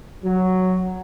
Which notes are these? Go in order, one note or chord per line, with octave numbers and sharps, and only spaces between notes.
F#3